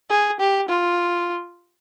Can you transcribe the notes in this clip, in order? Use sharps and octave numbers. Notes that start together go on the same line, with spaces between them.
G#4
G4
F4